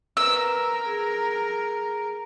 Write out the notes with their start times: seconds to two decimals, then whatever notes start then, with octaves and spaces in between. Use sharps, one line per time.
0.17 A#4 B4 E6
0.86 G#4